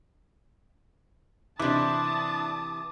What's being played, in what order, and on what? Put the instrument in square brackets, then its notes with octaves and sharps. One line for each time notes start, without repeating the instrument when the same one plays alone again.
[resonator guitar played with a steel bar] C3 E3 [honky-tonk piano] D4 E4 [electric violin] A5 D#6 [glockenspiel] D6